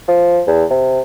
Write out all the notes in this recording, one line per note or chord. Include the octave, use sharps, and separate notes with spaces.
F3
E2
C3